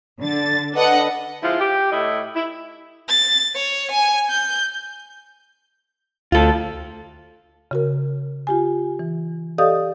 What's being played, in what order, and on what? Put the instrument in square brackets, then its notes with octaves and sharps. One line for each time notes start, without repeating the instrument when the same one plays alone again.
[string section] D3 A6
D4 A4 B4 D#5 F#5
[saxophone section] F3 G#3 E4 F4
G4
A2 E4 D#5
E4
[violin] A6
C#5
G#5
G6
[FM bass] D2 [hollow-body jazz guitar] F4 A4
[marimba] C#3 F#4 A#4
F4 G4 G#5
E3
G4 A4 D5 D#5 F5 D#6